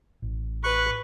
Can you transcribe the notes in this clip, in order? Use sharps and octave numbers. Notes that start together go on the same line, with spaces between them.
A1
B4 C#6 F#6